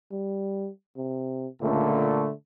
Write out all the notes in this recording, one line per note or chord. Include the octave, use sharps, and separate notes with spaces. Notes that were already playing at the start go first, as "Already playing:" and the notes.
G3
C3
C#2 A#2 D3 A3